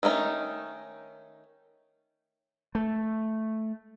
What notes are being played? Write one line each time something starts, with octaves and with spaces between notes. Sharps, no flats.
D#3 A3 C#4 D#4
A3